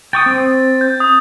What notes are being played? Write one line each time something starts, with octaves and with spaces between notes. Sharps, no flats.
G5 C#6 D#6 A6
C4
G6
D#6